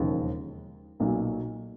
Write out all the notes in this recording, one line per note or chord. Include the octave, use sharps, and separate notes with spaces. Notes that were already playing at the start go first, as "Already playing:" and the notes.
Already playing: E1 D#2 C#3 F3
B1 A#2 F#3